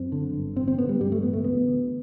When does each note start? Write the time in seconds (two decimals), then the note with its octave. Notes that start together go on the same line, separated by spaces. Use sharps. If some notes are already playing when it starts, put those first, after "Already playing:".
Already playing: F#2 C4
0.12 D3
0.34 G1
0.56 A1 C4
0.68 C4
0.78 D3 B3
0.89 G3
1.00 G2 G3
1.12 A3
1.23 A1 B3
1.33 A3
1.44 D2 B3
1.66 D2